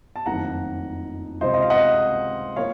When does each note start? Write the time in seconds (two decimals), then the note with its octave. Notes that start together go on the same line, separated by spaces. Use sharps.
0.16 A5
0.26 F#1 F2 D#3 A3 F#5 A#5
1.41 C#2 C3 F3 C5 D#5
1.54 D#5
1.62 F5
1.70 D#5 F#5
2.56 F3 A#3 C#5 F5